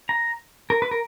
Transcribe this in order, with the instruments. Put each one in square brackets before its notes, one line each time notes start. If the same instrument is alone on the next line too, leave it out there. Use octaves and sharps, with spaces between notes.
[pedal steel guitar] A#5
A#4
B4
A#4